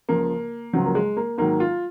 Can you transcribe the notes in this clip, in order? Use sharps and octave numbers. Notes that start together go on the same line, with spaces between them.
C#2 C#3 F3 A#3
C#2 C#3 F3 F#3
A#3
G#3
A#3
G#2 D#3 F#3 A#3
F4